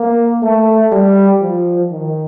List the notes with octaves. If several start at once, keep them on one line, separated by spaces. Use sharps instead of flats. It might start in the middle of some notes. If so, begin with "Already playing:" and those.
Already playing: A#3
A3
G3
F3
D#3